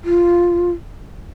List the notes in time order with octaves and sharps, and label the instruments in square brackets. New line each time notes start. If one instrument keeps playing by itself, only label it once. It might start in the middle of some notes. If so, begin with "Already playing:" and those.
[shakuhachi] F4